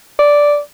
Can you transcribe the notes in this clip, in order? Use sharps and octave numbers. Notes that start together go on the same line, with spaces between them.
D5